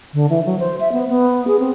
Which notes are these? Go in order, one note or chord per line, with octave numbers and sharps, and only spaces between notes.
D3
E3
F#3
C5
E5
B3
B3
G#4
C4